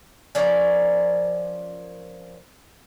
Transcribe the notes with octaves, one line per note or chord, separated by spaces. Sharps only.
F3 C#4 A#4 D5